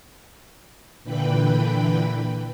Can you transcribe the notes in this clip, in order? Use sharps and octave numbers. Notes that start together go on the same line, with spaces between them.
A#2 D3 E3 B4 G5 B5